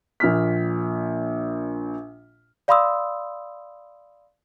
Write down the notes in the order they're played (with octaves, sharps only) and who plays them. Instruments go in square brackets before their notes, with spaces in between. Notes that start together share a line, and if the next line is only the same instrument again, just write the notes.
[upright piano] A#1 A#2 F6 B6
[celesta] D5 F5 B5 C6 D#6 E6